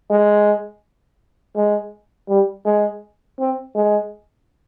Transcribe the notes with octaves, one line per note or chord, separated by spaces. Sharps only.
G#3
G#3
G3
G#3
C4
G#3